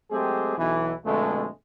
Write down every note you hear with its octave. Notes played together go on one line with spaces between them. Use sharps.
F#3 G#3 A3 C4 G4 G#4
B1 E3
F2 B2 D3 G#3 A3